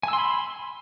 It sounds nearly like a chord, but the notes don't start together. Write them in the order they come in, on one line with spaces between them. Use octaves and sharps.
G#5 E6 C6 B5